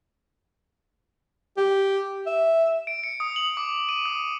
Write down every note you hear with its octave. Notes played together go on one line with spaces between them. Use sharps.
G4
E5
D7
C#7
D#6
F#7
D6
D#7
D#6